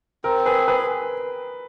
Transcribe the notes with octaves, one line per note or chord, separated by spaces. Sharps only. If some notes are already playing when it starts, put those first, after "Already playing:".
C4 A#4
G#4 B4
G#4 B4